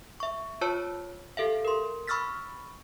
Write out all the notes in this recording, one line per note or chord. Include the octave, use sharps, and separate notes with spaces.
E5 C#6
F4 C5 C#5 A5 E6
G4 A4 E5 F5
A#4 C6
B5 C#6 E6 F6 A6 B6